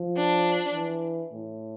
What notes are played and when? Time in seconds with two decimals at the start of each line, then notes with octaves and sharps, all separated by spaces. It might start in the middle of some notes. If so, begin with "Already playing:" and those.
Already playing: F3
0.16 D4
0.75 E3
1.33 A2